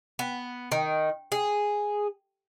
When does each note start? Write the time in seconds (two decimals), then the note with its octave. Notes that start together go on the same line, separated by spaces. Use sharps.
0.19 B3
0.72 D#3
1.32 G#4